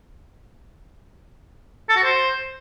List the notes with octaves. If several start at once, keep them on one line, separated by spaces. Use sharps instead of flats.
A4
F#4
C5